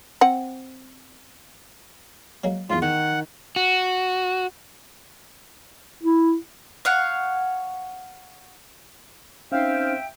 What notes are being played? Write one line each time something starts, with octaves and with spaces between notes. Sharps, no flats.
C4 F#5
F#3 G#3 A#3
E2 G#2 F4
D#3 F#5
F#4
E4
C#5 F5 F#5
C4 C#4 D#4 E5 F5 G5